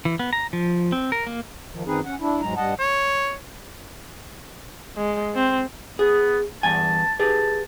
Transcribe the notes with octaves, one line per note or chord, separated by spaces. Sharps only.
E3
B3
A#5
F3
C4
A#4
A#3
D#3 F3
F#2 D#3 C4 D#4 G#4 B4
C#4 F#5
D4 E4
E2 G#2 F#3 G#3 A#5
G2 G3 D#5 F#5 A5
C#5
G#3
C4
B3 G#4
E2 G2 G#5 A5
G4 G#4 B4 A5